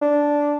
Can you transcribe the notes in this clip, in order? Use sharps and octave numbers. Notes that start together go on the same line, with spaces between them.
D4